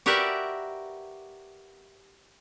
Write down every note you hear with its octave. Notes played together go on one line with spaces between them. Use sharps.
F#4 G4 A#4 B4 D5 E5